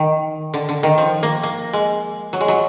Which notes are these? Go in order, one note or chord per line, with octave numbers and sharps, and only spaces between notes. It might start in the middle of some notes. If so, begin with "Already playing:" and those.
Already playing: D#3
D3
D3
D#3
F3
A#3
A#3
G#3
F#3
G#3
F#3